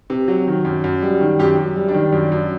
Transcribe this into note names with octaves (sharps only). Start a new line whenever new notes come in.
C3
F#3
D#3
F#2
F#2
G3
D#3
F#2 G4
F#2
G3
D4
D#3
F#2
F#2